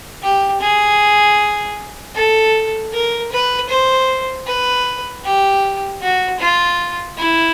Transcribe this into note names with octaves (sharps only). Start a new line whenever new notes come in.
G4
G#4
A4
A#4
B4
C5
B4
G4
F#4
F4
E4